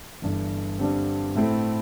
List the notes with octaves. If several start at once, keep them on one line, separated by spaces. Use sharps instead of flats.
G1 G2 E3
G2 D3 G3 C4
A2 A3 C4 E4 A4